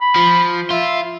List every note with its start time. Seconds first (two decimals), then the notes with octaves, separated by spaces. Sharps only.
0.01 B5
0.16 F3
0.70 F4 E5